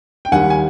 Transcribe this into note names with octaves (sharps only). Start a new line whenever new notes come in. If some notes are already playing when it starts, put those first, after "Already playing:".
G5
D#2 D#3 G3 F#5 G#5
G#5